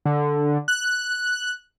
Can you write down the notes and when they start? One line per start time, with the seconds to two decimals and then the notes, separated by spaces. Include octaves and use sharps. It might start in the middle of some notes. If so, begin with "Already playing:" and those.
0.05 D3
0.68 F#6